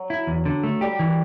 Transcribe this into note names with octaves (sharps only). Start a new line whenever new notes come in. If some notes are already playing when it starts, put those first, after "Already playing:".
Already playing: F#3
E4
E2
D3
A3
G3 G4
E3